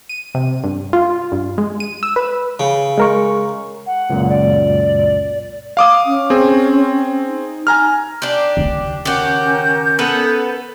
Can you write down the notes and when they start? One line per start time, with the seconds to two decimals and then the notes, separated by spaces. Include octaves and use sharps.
0.09 D#7
0.35 C3
0.64 G2
0.93 F4
1.32 G2
1.58 G#3
1.80 D#7
2.03 E6
2.16 B4
2.60 C#3
2.98 G#3 A#4 C#6
3.86 F#5
4.10 C#2 F#2 A#2
4.29 D5
5.77 F5 D6 D#6
6.06 C#4
6.30 C4 G#4
7.27 D#4
7.67 G#5 A#5 F6
8.22 D4 G4
8.57 D#2 C#3
9.05 C#4 F#4 G4 A#4 G6
9.99 B3 A4 B4